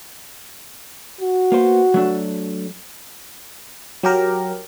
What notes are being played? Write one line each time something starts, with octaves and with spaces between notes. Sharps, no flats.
F#4
A#3 B3 C5
F#3 A3 D4
F#3 G4 A#4